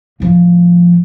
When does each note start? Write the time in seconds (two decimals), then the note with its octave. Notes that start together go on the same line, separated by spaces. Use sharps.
0.20 A2 F3